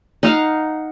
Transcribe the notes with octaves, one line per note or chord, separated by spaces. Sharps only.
D#4 F5 F#5